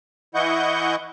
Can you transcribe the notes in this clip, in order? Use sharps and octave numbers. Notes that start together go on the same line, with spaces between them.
E3 E4 D#5 F#5 C#6 G6